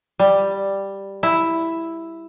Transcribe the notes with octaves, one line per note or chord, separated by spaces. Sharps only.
G3
E4